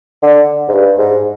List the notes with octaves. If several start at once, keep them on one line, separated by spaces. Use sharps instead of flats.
D3
G#2
G2
G#2